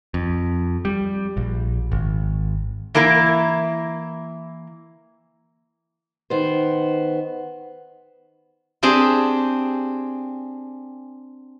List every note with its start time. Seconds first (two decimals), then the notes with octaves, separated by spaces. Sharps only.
0.14 F2
0.85 G3
1.37 A#1
1.92 G#1
2.95 E3 A#3 E4 A#4
6.30 D#3 B3 C5
8.83 C4 D4 G4 G#4